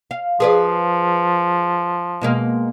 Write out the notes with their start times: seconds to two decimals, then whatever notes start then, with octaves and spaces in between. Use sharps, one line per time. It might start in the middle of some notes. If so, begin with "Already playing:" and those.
0.11 F5
0.40 F3 G#4 B4 D5
2.21 B2 G#3 A#3